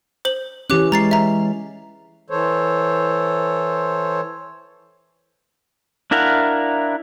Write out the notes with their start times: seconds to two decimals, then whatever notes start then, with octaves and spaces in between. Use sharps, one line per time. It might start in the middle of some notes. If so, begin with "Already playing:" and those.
0.25 C5 F#7
0.70 E3 C#4 G4 D6 F#6
0.92 G#3 A#5 A6 C7
1.11 E5 A#5
2.30 E3 A4 C5 C#5
6.11 D4 E4 A#4 F5 F#5